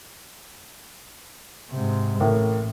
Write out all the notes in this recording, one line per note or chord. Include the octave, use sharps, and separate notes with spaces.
G#2 C3
A1 A2 A#3